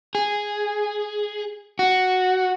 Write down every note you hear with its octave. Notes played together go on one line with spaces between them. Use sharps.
G#4
F#4